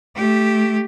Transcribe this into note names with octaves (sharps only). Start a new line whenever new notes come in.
A3 G4